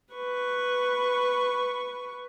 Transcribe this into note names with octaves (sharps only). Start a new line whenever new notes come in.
B4 C#6